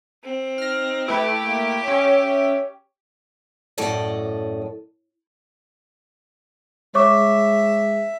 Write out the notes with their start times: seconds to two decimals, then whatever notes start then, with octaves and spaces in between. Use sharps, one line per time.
0.24 C4
0.58 D#4 F6 A#6
1.08 A3 E4 G4 B4
1.43 A#3
1.83 C#4 C#5 E5
2.26 C#5
3.78 F#2 A2 A4 D5 D#5
6.95 G#3 C#5 E5 C#6 D6